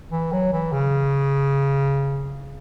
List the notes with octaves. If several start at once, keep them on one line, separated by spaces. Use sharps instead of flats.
E3
F#3
E3
C#3